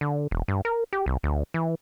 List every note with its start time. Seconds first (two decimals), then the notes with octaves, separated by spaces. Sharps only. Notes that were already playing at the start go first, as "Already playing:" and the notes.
0.01 D3
0.31 E1
0.48 G2
0.65 A#4
0.93 G4
1.06 C2
1.23 D2
1.54 E3